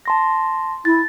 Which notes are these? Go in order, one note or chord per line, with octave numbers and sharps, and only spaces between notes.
A5 C6 A#6
E4 A6